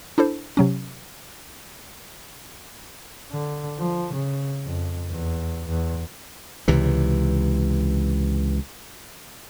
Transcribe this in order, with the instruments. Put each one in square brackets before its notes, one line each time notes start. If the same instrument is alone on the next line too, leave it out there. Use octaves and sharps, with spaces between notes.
[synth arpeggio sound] D4 E4 A4 C5
C3 F#3 C#4
[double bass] D3
F3
C#3
F2
E2
E2
[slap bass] C#2 C3 E3